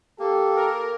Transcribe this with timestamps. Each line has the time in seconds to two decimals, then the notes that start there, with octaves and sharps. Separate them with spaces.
0.19 A#3 G4 A4
0.56 A#4